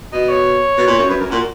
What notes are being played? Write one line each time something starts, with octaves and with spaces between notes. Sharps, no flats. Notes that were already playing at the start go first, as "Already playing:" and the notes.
B2 D#5
C#5
B2
A#2
F#2
F#2 B4
F#2 A#4
A#2 F#4